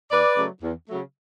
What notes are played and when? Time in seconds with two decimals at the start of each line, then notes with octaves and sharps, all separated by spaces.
0.10 E2 B4 D5
0.36 C#3 F#3 A3
0.61 E2
0.88 C#3 F#3 A3